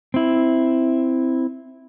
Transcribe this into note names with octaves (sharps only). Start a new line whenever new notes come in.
C4 E4